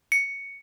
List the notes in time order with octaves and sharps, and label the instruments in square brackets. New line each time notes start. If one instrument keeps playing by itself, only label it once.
[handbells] C#7